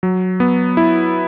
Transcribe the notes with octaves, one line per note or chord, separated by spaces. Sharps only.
F#3
B3
E4